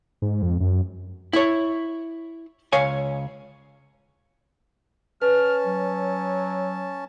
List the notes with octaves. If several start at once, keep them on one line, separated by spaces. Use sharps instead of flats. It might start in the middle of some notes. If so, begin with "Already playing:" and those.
G#2
F2
F#2
E4 C#5
C#2 C#5 F5 G#5
C#4 B4 A5 F6
F#3